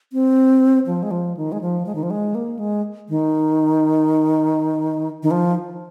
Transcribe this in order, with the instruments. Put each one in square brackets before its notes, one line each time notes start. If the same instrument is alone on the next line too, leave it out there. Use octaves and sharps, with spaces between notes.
[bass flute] C4
F3
G#3
F3
D#3
G#3
F3
G#3
D#3
F3
G#3
A#3
G#3
D#3
D#3
F3